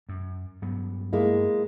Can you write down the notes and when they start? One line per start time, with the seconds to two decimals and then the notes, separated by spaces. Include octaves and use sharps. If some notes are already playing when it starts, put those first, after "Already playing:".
0.09 F#2
0.62 G2 F#3 B3
1.13 G#3 A#3 E4